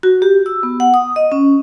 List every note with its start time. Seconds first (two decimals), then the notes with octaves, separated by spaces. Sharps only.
0.03 F#4
0.22 G4
0.46 E6
0.63 B3
0.80 F#5
0.94 D#6
1.16 D#5
1.32 C#4